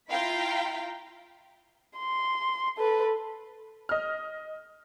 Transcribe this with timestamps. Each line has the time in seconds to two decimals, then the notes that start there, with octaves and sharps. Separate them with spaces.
0.10 E4 F4 F5 G5 A#5 B5
1.98 C6
2.78 A4 B4
3.89 D#5 F6